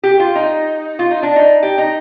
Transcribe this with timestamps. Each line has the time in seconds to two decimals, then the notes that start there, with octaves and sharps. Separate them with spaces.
0.03 G4
0.20 F4
0.35 D#4
0.99 F4
1.11 D#4
1.23 D4
1.36 D#4
1.63 G4
1.78 D#4